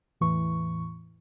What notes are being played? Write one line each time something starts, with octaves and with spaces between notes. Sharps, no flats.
E2 A2 E3 C#6